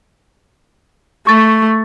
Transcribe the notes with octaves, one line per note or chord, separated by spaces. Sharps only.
A3 C#6 A6